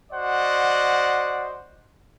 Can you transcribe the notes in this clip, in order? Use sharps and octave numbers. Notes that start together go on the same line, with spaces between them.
F#4 C5 D5 D#5 F#5